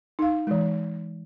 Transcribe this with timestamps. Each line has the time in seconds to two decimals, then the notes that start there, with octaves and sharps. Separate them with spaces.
0.19 D#4 F5
0.47 E3 G#3